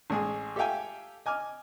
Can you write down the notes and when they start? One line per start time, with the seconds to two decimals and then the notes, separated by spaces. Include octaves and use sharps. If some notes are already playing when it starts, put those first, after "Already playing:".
0.10 A1 G#3 G#4
0.56 G4 A4 E5 F5 G5 G#5
1.26 D#5 G#5 D6 F6